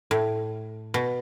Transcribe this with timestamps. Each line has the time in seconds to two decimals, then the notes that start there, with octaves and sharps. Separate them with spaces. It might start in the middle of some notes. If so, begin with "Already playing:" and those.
0.11 A2
0.94 B2